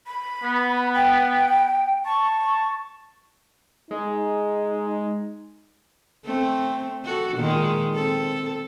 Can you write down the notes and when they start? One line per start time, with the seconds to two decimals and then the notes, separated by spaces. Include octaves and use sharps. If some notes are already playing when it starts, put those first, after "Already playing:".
0.07 B5
0.43 B3
0.94 G5
2.06 A5 C#6
3.91 G#3 D#4
6.25 A3 C4
7.05 F#4 A4
7.36 A#2 D#3 G#3
7.95 C4 A4